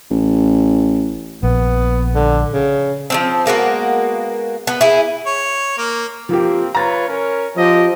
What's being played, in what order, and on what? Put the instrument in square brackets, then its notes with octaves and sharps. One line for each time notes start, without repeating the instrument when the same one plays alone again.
[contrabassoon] A1
[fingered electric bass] A#1 [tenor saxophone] B3
[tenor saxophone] D3
C#3
[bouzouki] F3 A#3 C4
G#3 A#3 B3 F#4
B3
E4 G#4
[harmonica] C#5
A#3
[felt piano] F3 G4 [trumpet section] A#3 C4
[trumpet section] F4 B4 C#5 [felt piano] A#5 A6
[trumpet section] C#4 A#4 C#5
[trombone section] F3 [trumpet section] C4 G4 D#5